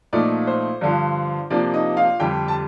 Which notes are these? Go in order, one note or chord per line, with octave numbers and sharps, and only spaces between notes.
A#2 F3 A3 D#4 D5
C5
G2 D3 F3
C3 F3 A#3 D4 D5
D#4 D#5
F4 F5
F2 D3 G3 G4 G5
A5